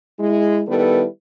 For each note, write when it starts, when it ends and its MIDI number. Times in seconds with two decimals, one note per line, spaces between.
0.19 0.62 56
0.19 0.62 64
0.68 1.04 51
0.68 1.04 55
0.68 1.04 59
0.68 1.04 64
0.68 1.04 69
0.68 1.04 71